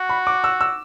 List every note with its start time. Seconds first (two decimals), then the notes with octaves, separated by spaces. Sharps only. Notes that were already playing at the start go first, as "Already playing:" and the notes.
Already playing: F#4
0.09 B5
0.27 D6
0.44 E6
0.61 E6